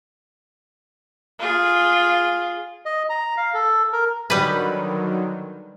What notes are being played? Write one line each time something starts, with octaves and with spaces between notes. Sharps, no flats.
F4 G#4
D#5
A#5
F5
A4
A#4
D3 D#3 F#3 G3 B4